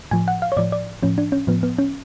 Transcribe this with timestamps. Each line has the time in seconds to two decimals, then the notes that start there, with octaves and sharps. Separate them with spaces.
0.11 A2 F3 G#5
0.28 F#5
0.42 F5
0.52 C#5
0.57 A2 F3 D5
0.72 D5
1.03 A2 F3 C#4
1.18 D4
1.32 C#4
1.47 A2 F3 B3
1.63 B3
1.79 C#4